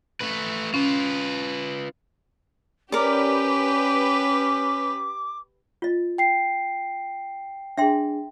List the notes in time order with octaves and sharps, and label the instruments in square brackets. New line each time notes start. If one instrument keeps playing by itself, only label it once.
[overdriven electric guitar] A3 B4
[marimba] C#4 [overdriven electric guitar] F4 B4
[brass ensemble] C#4 [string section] G4 B4 [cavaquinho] A#4 D5 [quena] D6
[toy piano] F4 D#5
[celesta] G5 C7
[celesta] D4 G#4 [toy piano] E5 G5 C6